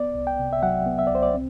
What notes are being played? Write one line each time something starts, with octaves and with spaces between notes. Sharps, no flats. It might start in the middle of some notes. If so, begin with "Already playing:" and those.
Already playing: B3 D5
C2
G5
C3
E5
F#3 F#5
B3
E5
D5
C2 C5
D5
C4